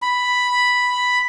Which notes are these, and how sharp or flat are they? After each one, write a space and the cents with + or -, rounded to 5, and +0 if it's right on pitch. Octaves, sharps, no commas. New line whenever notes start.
B5 +0